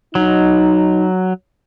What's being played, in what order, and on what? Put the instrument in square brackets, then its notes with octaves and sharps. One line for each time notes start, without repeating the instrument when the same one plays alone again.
[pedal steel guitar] F#3 [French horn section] D#4